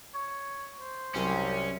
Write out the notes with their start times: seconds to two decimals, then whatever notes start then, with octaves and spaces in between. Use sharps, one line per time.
0.15 C#5
0.80 C5
1.15 C2 F#2 C#4 A#4 C6